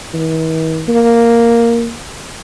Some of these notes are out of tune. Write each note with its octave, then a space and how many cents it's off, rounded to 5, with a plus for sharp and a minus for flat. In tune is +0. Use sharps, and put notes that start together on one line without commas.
E3 -45
A#3 +0